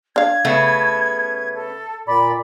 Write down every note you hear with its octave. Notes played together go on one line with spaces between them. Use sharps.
D4 F5 G#6
C#3 A3 B3
A4
A#2 D5 B5 A6